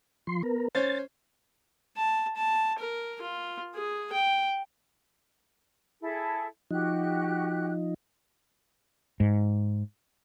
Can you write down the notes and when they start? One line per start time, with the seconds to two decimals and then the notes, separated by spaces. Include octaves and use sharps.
0.27 F3 C6
0.43 B3 A#4
0.75 C#4 C5 A6
1.97 A5
2.37 A5
2.79 A#4
3.22 F4
3.75 G#4
4.12 G5
6.01 E4 G#4 A4
6.71 F3 D#4 F#4 G4 F#6
9.20 G#2